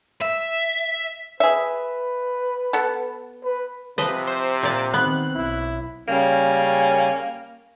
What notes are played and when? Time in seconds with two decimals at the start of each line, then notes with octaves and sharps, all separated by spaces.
0.22 E5
1.40 G#4 B4 E5
2.73 B3 A4
3.44 B4
3.98 C3 F3 B4 D#5
4.27 C5
4.63 A#2 D5
4.94 D#3 B3 C4 F#6
5.35 B1 E4
6.08 C#3 G3 A#3 C#4